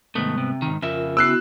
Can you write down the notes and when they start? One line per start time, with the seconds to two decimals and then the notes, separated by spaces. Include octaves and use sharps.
0.15 C2 G#2 D#3 A3 B3
0.38 C3
0.62 G#2 D#3
0.82 F2 C#3 F4 A#4 E5
1.17 B3 E4 F#4 E6 F#6 C7